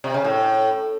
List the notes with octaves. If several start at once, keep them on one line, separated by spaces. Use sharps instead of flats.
C3
C#3
A2